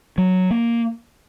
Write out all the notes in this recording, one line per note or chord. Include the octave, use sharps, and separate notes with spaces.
F#3
A#3